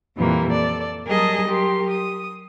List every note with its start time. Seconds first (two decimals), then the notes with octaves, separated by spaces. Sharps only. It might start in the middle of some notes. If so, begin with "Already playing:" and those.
0.18 F2 A#2 E3 G3 A#3 F4
0.49 A4 D5
1.06 F#3 G3 G#4 A#4 D#5 A5
1.47 F#3 G4 A#4 C6
1.90 D#6